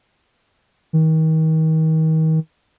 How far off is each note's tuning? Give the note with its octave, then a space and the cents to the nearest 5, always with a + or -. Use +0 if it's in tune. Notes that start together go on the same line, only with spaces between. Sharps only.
D#3 +35